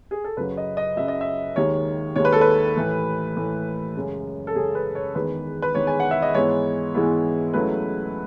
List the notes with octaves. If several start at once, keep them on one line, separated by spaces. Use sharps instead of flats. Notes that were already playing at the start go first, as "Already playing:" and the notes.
G#4
A4
F#2 C#3 F#3 B4
D#5
D#5
F#2 C#3 F#3 E5
D#5
E5
D#2 D#3 G#3 C#5
D#2 D#3 G#3 C#5
B4
A4
B4
A2 E3 A3
A2 E3 A3
F#2 C#3 G#3 C#4
A4
F#2 C#3 G#3 C#4 G#4
B4
C#5
E2 D#3 G#3 B4
B4
E2 D#3 G#3 C#5
G#5
F#5
E5
D#5
G#2 E3 G#3 B3 E4 C#5
G#2 E3 G#3 B3 E4
C#2 C#3 F#3 A3 E4 B4